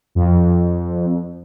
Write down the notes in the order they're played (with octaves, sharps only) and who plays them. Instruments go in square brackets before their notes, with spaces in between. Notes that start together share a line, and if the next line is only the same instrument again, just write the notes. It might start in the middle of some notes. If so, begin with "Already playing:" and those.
[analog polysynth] F2